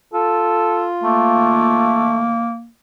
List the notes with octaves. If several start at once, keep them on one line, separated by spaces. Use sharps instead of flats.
F4 A4
A3 A#3